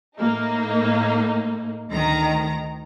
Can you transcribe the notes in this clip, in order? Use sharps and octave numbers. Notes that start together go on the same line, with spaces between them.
A2 A#3 D#4
D2 D#3 A#5